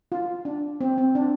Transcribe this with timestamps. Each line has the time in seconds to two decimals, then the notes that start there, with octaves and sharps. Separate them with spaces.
0.12 F4
0.45 D4
0.81 C4
0.98 C4
1.15 D4